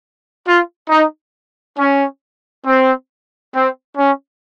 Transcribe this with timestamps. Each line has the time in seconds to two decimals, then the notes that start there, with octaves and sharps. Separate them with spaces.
0.45 F4
0.89 D#4
1.77 C#4
2.65 C4
3.53 C4
3.97 C#4